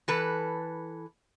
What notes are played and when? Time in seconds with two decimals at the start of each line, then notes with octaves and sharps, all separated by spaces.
0.08 E3 A4 B4